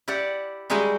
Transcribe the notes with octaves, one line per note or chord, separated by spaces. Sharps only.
E4 G4 D5 F#5
G3 G#3 D#4 E4 F#4 G#4